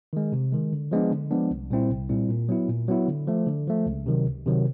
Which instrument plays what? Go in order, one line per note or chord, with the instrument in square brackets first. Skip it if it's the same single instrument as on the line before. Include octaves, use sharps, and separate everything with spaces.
[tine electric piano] D#3 G#3
C3
D#3 G#3
D3
F3 G#3 B3 D4
D3
F3 G#3 B3 D4
C2
A#2 G3 C4 E4
C2
A#2 G3 C4 E4
A#2
F#3 B3 E4
A#2
F#3 B3 E4
D3
F3 A3
D3
F3 A3
C#2
C3 D#3 F#3
C#2
C3 D#3 F#3